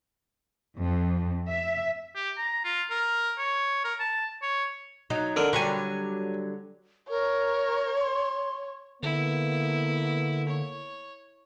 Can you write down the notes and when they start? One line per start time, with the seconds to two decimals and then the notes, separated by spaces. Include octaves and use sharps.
0.78 F2
1.46 E5
2.15 G4
2.37 A#5
2.64 F4
2.90 A#4
3.38 C#5
3.84 A#4
4.00 A5
4.42 C#5
5.10 F#3 D#4
5.36 D3 A#4
5.53 D3 F#3 G3 G#5 C#6
7.10 A#4 C#5
8.00 C6
9.03 D3 A#3 B3 E4
10.48 C#5